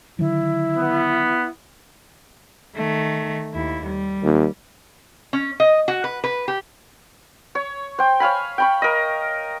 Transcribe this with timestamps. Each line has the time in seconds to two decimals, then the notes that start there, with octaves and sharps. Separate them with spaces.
0.19 D3 D#3 F#3 E4
0.77 B3
2.76 D#3 A3
3.54 D#2 E4
3.85 G3
4.23 D#2
5.33 C#4
5.60 D#5
5.88 F#4
6.04 B4
6.24 B4
6.48 G4
7.55 C#5
7.98 C5 G5
8.20 C#5 F5 G#5 B5
8.58 G5 B5 C#6
8.82 A#4 D#5